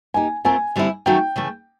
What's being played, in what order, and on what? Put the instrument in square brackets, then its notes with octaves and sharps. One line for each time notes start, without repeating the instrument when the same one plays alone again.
[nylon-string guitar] A#3 D#4 G4 [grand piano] G#5
[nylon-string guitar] A3 C4 F4 A#4 [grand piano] G#5
[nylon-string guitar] D3 G3 C4 E4
[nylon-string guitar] D#3 F#3 A3 C#4 F#4 [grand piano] G5
[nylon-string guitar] C#3 E3 A3